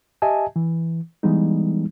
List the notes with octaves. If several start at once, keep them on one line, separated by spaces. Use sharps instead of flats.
G4 D#5 E5 G#5 A5
E3
E3 G3 G#3 B3 D#4